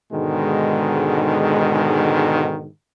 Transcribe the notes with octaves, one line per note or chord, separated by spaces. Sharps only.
G#2 B2 D3 D#3 G#3